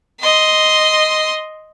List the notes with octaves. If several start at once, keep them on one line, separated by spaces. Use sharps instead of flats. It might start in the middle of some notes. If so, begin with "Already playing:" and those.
D#5 C6